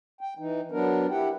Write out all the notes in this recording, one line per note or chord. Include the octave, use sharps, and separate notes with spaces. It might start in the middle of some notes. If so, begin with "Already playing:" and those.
G5
E3 D#4
F#3 B3 D4 A#4
E4 G4 F#5 G5